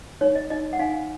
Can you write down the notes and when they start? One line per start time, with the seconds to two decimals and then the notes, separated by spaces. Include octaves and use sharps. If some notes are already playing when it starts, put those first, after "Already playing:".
0.21 D#4 C#5
0.35 D#5
0.50 D#4 D#5
0.73 F#5
0.79 D#4 F5 G#5